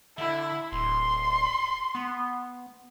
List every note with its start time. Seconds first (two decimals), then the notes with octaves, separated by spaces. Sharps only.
0.18 D3 E4
0.72 D1 C6
1.95 B3